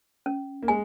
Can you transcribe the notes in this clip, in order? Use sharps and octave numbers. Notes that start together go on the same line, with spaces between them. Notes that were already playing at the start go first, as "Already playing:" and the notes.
C#4
A#3
G#3 G#5